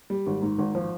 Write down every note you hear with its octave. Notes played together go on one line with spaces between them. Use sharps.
G3
G#1
G#2
G#1
F3